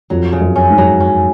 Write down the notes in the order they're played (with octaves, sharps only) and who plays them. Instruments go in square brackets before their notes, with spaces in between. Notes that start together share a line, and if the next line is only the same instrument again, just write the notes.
[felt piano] F2 [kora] F#3
[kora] C#3
[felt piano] F#2
[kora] C#4
[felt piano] G#2
[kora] F#3
C#4